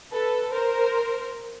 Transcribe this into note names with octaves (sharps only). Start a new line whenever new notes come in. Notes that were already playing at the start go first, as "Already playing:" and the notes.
A4 B4
A#4 C5